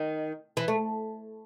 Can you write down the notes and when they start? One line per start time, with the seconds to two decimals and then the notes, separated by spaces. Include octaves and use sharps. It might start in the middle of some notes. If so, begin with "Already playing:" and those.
Already playing: D#3
0.57 E3
0.68 A3